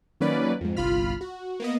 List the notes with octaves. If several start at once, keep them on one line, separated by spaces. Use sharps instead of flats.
D#3 F#3 A#3 C#4 B4 D5
F2 G#2
G1 C2 F4 B5 F6
F#4
A#3 B3 D#5